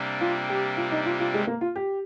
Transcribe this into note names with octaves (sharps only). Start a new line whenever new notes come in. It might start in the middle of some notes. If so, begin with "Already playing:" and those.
Already playing: C3 G3 A#3 D4
F4
G4
F4
D#4
F4
F4
G#3
A#3
F4
G4